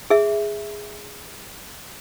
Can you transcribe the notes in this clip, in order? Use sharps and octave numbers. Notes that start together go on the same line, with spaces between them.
G#4 E5